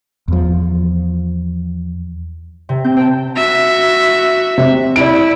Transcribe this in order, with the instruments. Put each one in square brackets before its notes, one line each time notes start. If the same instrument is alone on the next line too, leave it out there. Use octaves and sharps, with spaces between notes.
[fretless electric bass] E2 F3
[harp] C3
[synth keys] C4 [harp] G6
[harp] C5 A5 [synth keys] G5
[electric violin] F#4 E5
[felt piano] C3
[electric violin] E4 [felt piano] D5 D7